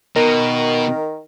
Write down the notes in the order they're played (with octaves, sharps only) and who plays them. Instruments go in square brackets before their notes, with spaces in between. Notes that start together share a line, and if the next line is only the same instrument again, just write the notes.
[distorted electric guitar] B2 [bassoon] D#3 [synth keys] A#4